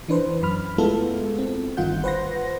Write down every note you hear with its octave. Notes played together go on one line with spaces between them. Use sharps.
E3 D4 B4 C5
F#2 B5 F6
G#3 A3 B3 E4 F4 A4
C4
G1 G2 D#3 F4 F#5 G6
B4 C5 F#5 C6 A#6